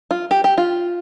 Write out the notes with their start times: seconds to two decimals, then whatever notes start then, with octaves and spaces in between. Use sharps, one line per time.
0.11 F4
0.31 G4
0.44 G4
0.58 F4